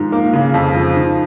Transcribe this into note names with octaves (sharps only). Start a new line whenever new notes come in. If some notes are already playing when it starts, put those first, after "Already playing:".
Already playing: G#2 D#3 F3
A#3
C#3
F2
F3
D#3